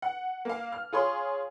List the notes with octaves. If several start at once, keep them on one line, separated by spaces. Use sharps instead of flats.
F#5
A#3 F5
F6
F4 G#4 C#5 C6